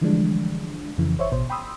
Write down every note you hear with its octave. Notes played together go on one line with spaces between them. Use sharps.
D3 E3 F3 G3 G#3 D4
F2 C#3 E3
G1 C5 C#5 E5 C#6
A1 B2 C5
G5 B5 C6 D#6 E6